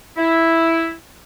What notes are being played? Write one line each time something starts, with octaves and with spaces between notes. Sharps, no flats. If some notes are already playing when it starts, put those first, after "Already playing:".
E4